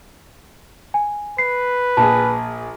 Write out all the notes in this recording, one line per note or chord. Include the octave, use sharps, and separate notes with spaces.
G#5
B4 C7
A#1 G#4 A5